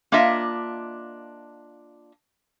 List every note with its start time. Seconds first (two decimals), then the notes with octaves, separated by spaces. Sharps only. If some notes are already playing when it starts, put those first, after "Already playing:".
0.12 A#3 D4 F4 D#5 E5